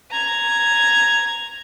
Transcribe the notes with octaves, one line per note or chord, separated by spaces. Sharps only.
A#5 G#6